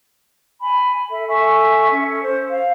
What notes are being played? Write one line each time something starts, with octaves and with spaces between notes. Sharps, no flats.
G#5 B5
A4 E5
A4 E5 G#5 C#6
C#4 A4
C5
F5